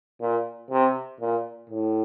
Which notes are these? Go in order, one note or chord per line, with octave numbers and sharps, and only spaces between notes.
A#2
C3
A#2
A2